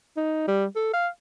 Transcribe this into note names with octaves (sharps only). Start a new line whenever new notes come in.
D#4
G3
A4
F5